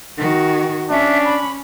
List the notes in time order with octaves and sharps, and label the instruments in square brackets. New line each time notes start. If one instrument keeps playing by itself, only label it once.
[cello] D#3 F#4
[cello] C#4 [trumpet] D4 [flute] E5
[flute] B5